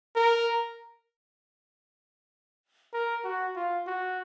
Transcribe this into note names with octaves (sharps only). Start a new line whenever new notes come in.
A#4
A#4
F#4
F4
F#4